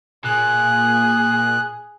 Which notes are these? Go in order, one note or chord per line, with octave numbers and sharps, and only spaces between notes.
A#2 G#4 F#6